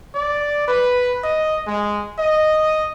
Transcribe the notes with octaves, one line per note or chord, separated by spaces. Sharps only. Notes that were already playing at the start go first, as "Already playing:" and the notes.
D5
B4
D#5
G#3
D#5